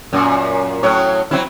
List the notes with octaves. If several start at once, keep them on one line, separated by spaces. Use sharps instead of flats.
F#2 A#2
A2 F#3 C#5
F#3 C4 E4